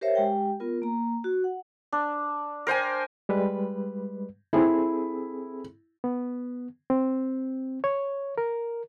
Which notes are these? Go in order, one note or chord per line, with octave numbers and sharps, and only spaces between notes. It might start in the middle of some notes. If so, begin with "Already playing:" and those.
G4 A#4 C5 C#5 E5 F5
G#3 G4 G5
B3 F4 A#4
A#3 A#5
F#4
F#5
D4
A#4 C5 G5 G#5
G3 G#3 B4
C4 E4 G#4 A4
B3
C4
C#5
A#4